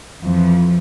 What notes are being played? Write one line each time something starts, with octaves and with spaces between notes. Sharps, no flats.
F2 E3 F3